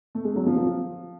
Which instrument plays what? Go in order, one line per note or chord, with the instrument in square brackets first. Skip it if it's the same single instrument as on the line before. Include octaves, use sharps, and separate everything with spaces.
[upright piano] A3
G#3
F#3
F3
F3